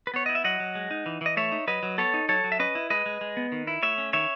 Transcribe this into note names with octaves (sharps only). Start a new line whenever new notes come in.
B4
B3 C#5
E4 D#5
E5
F#3 D#5 F#5
F#3
G#3
D#4
E3
E3 D#5
A3 C#5 E5
D#4
F#3 B4 D#5
F#3
B3 A4 C#5
D#4
F#3 A4 C#5
F#3
E5
C#4 B4 D#5
E4
G#3 B4 D#5
G#3
G#3
B3
D#3
E4
A3 C#5 E5
C#4
D#3 C#5 E5